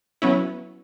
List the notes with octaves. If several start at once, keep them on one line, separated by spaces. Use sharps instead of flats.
F#3 B3 C#4 E4